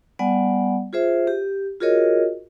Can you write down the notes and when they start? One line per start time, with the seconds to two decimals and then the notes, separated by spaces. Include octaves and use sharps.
0.19 G3 B3 D5 F#5 G#5
0.93 F4 G#4 C5 E5
1.27 G4
1.81 F4 F#4 G#4 A#4 C#5 D#5